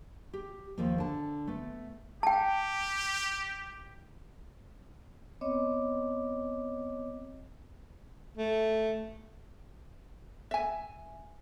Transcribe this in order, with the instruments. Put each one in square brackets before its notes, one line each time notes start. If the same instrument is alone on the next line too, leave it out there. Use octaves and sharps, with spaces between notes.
[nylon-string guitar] G4
D#2 F3 A#3
D3 A5
A3 B3
[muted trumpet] G4 [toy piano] G5 A5
[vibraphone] B3 C4 C#5 D#5 D6
[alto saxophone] A3
[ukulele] E5 G#5